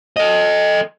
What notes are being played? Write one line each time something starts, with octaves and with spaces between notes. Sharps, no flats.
A4 D#5